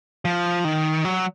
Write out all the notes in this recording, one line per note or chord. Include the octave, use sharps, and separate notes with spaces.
F3
D#3
F#3